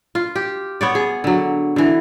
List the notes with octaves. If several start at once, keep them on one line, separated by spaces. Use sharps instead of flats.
F4
G4
B3 C#5 D5
G#4
D3 F#3
D3 E3